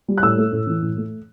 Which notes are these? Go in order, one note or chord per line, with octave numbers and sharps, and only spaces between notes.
G3
F#6
A2 E6
A3
A2
E3
A2
A3